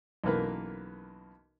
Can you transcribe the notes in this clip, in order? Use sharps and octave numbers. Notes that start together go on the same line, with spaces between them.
B1 F#2 E3 A#3 A#4 B4